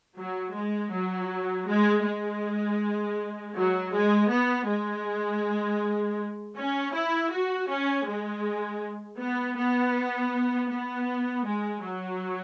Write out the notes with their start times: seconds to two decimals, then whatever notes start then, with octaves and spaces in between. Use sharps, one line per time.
0.17 F#3
0.54 G#3
0.92 F#3
1.67 G#3
2.05 G#3
3.56 F#3
3.92 G#3
4.31 B3
4.67 G#3
6.57 C#4
6.93 E4
7.31 F#4
7.69 C#4
8.07 G#3
9.19 B3
9.57 B3
10.70 B3
11.45 G#3
11.82 F#3